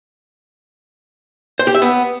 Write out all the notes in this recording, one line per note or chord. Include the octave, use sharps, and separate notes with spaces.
C5
G4
E5
B3